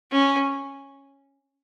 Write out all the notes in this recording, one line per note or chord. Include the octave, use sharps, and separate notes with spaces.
C#4